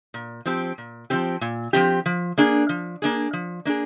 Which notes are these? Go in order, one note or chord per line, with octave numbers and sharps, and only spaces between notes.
A#2
F3 C4 G4
A#2
F3 C4 G4
A#2
F3 C4 G4
F3
A#3 D4 G#4
F3
A#3 D4 G#4
F3
A#3 D4 G#4